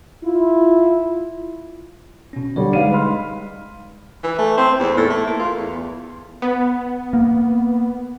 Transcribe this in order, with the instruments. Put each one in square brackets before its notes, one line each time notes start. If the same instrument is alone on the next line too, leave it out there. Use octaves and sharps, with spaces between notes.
[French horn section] E4 F4
[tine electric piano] B2 C#4
[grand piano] D3 G3 [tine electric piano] C#5
[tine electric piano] G#3 D#4 [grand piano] B4 F5 D#7
[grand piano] B5 C6 F6
[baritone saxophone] E3
A3
C4
E2
A2
A3
A#3
F4
E2
[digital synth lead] B3
[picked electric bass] A#3